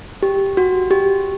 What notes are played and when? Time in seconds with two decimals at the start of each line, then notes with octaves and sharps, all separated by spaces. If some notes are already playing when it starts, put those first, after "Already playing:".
0.23 G4
0.57 F#4
0.91 G4